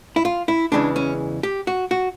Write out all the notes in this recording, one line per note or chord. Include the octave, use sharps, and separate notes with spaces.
E4
F4
E4
E2 C#3 E3 G#3 D4
C#4
G4
F#4
F#4